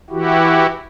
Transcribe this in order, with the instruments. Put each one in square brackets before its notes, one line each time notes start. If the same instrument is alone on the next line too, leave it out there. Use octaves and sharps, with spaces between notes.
[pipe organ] E3 E4 F#4 G4